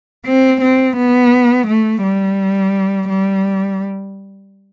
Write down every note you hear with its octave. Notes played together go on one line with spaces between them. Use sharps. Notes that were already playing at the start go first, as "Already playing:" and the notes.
C4
C4
B3
A3
G3
G3